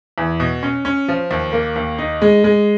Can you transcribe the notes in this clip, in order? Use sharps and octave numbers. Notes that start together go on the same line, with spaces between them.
E2
B2
C#4
C#4
F3
D#2
A#3
D#2
D#4
G#3
G#3